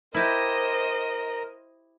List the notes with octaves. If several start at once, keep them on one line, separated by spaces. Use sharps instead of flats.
E4 G4 A#4 C5 D#5